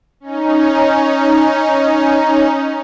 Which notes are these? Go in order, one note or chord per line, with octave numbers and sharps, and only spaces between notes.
C#4 D#4